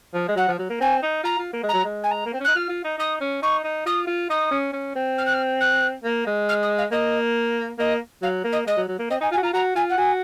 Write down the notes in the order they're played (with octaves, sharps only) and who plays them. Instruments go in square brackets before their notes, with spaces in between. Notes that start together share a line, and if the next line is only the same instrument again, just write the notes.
[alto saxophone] F3
G#3
[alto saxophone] F#3 [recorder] F#5
[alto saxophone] F3
F#3
A#3
[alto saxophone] C4 [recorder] G#5
[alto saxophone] D#4
[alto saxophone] F4 [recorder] A#5
[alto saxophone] F4
A#3
[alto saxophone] G#3 [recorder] A#5
[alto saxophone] F#3
G#3
[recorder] G#5
A#5
[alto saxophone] A#3
C4
C#4
[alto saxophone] D#4 [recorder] F#6
[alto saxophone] F4 [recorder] F6
[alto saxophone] F4
D#4
[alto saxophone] D#4 [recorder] D#6
[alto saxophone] C#4
[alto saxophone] D#4 [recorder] C#6
[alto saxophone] D#4
[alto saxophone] F4 [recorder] D#6
[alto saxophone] F4
[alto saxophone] D#4 [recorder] D#6
[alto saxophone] C#4
C#4
C4
[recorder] F6
F#6
F6
F#6
[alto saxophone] A#3
G#3
[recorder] F6
D#6
F5
[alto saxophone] A#3 [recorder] D#5
[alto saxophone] A#3 [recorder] D#5
[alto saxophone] F#3 [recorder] F5
[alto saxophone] A#3
[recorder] D#5
[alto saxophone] G#3 [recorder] D#5
[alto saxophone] F#3
F#3
A#3
[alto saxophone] C4 [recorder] D#5
[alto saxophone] D#4 [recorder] G#5
[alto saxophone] F4 [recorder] G#5
[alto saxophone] F#4
[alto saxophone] F4 [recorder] A#5
[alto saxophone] F#4 [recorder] A#5
[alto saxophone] F4 [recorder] G#5
[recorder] F#5
[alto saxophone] F#4 [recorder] G#5